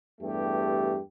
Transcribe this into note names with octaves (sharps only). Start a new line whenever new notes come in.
E2 G2 A3 G4